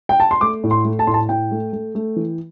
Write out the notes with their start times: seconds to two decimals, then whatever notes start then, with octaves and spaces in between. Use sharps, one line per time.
0.09 G5
0.20 A5
0.31 C6
0.41 A3 D6
0.64 A2
0.71 C6
0.85 A3
0.99 A5
1.07 A2 C6
1.14 A5
1.29 A2 G5
1.51 A3
1.73 A3
1.95 A3
2.16 E3